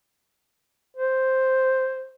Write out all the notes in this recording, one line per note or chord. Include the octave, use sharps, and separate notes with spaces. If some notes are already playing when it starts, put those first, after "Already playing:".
C5